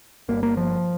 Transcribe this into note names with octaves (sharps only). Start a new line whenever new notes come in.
G1 G2 A#3
A#3
F3